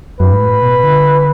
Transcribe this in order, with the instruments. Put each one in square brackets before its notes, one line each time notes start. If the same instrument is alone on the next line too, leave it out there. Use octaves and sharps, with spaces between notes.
[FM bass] F#2 [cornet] B4
[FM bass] G#2
A2
B2
D3